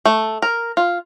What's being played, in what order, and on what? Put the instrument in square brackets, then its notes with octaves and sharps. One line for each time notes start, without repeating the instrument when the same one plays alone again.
[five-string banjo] A3
A#4
F4